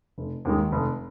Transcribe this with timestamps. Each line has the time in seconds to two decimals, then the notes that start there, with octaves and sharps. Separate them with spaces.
0.18 F1
0.45 D#2 D#3 G#3
0.72 F1